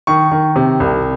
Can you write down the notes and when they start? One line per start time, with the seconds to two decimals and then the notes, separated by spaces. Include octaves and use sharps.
0.07 D#3 C#6
0.31 D#3
0.56 C3
0.80 C2